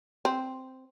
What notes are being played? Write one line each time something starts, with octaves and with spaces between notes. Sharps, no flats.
C4